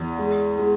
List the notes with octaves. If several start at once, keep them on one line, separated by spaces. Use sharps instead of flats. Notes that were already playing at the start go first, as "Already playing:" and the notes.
Already playing: E2
G#3
G#3